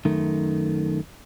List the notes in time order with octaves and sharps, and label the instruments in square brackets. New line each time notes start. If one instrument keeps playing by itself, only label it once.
[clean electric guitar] F#2 D#3 A3